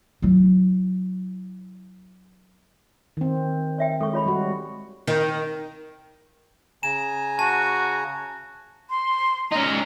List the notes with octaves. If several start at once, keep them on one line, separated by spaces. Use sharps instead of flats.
F#3 E4
D#3 C4
C#5 E5 G5
G#3 A4 C#6
F4 C#5 B5
G3 F#4
D#3
C#3 G#5 A#5 E7
F#4 A5
C6
C#4 D#4 A#5